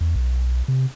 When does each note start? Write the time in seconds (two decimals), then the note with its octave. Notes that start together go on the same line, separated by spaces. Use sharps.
0.01 E2
0.16 B1
0.68 C3